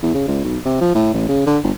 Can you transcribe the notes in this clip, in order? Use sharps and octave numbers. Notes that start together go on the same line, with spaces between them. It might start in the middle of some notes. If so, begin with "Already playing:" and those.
E2
C#3
C#2
B1
C3
F3
A2
A1
C#3
D3
G1